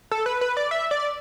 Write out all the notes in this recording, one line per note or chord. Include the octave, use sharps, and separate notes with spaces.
A4
B4
B4
D5
E5
D5